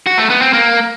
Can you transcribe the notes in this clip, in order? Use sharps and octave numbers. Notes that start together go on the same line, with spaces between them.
F#4
A3
B3
C4
A#3